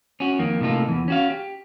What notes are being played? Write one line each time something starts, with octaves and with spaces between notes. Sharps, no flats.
C#4 F#4
F2 D#3 A#3
A2 C3 A#3 D#4 F4 A4
E2 E3
C#4 F#4 F5
G4